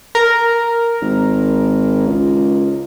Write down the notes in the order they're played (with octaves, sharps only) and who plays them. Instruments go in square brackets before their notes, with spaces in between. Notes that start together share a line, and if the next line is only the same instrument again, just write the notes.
[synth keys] A#4
[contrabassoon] G#1
C#2